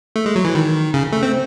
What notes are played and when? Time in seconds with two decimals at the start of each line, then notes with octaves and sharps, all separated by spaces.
0.16 A3
0.26 G#3
0.36 F#3
0.45 E3
0.55 D#3
0.94 C#3
1.13 A3
1.23 C4